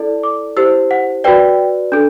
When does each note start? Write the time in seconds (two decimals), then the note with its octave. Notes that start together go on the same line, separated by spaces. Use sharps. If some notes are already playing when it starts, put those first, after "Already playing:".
Already playing: E4 A4 D5
0.23 D6
0.57 E4 G4 C5 E6
0.91 F#5
1.24 F#4 B4 D5 G5
1.92 D4 A4